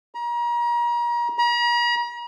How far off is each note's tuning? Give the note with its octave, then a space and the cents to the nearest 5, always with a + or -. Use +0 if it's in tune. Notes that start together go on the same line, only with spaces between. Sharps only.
A#5 +35
A#5 +45